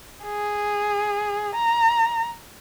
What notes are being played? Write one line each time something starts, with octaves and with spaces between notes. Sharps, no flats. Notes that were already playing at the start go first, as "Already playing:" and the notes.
G#4
A#5